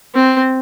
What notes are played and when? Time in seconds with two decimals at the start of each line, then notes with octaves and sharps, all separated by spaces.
0.14 C4